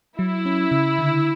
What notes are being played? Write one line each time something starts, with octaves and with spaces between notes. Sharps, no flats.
F#3 E4
C#4
C#3
D3